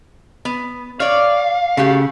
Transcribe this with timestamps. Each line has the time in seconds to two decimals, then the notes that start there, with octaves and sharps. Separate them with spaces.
0.45 B3
1.00 C#5 D5 F5
1.77 C#3 A3 F#4 G4